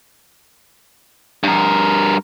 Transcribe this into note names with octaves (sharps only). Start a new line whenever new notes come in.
G2 A#4